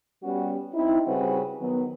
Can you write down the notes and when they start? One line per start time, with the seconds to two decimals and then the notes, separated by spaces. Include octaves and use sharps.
0.24 G3 B3 C#4 F#4 G4
0.73 C4 D#4 E4
1.06 C#3 G3 C4 F#4 B4
1.60 D#3 F#3 B3